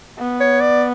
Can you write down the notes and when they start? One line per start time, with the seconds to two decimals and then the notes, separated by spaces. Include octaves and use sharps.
0.19 B3
0.40 C#5
0.61 D5